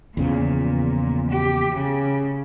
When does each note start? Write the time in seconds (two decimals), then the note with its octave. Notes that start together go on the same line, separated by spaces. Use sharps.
0.17 E2 A#2 C#3 F3
1.30 G4
1.75 C#3